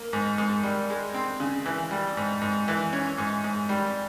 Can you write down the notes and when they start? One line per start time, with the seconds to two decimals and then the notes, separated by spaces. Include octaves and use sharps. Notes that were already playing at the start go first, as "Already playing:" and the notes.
Already playing: A#3
0.13 G#2
0.38 G#2
0.63 G3
0.90 G#3
1.14 C4
1.40 C#3
1.66 E3
1.91 G3
2.17 G#2
2.42 G#2
2.68 E3
2.93 C#4
3.18 G#2
3.44 G#2
3.69 G3